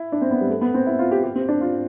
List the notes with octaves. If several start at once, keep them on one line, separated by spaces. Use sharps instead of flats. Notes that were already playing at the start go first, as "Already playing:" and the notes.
Already playing: E4
D4
C4
B3
G3
A3
B3
C4
E4
F4
G4
G4
C4
D4
F4